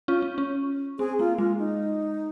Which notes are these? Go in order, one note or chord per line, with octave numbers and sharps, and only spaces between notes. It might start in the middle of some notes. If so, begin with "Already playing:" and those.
C#4 F4
C#4
C#4
C4 G#4
A#3 F4
G#3 F4
D#4